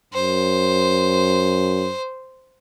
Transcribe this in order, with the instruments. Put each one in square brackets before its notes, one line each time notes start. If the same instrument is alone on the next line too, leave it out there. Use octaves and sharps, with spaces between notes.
[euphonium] F#2 [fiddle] C5